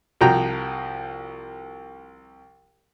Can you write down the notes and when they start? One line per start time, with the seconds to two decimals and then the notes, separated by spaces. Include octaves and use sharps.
0.21 C2 F3 F#4 G5 A#5